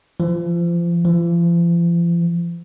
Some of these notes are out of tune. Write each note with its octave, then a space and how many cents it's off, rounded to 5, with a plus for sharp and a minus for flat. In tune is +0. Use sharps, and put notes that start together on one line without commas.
F3 -30
F3 -40